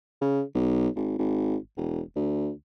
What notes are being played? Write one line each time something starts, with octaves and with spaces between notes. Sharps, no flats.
C#3
B1
G#1
G#1
E1
D2